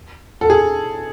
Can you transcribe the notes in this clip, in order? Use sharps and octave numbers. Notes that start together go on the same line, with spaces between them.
A4
G#4